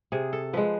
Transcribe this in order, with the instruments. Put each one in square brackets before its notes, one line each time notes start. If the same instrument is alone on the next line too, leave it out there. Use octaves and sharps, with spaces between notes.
[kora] C3 G#4
A4
F3 G#3 B4